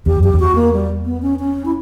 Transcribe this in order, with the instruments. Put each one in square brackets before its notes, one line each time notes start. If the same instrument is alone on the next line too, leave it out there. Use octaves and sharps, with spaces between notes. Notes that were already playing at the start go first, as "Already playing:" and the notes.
[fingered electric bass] E2 [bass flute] G4
[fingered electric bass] F#2 [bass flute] G4
[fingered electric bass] E2
[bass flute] F#4
A#3
G3
B3
C#4
C#4
E4